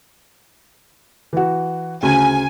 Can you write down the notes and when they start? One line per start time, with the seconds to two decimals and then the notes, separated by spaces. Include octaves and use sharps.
1.33 E3 F#4
2.03 D2 C#3 G#5